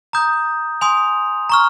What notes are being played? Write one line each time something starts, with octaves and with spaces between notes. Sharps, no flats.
A#5 D#6 G6
G#5 C6 D#6 F7
A#5 C#6 F6